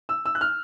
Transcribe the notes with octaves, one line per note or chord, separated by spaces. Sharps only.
E6
E6
F#6
F6